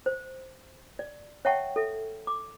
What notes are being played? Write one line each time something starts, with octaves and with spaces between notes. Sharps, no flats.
C5
D5
C#5 E5 F#5 G5 A5 C#6
A4 E5
D6